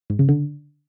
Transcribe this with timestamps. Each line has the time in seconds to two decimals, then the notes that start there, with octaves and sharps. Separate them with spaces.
0.10 G#2
0.19 C#3
0.29 D3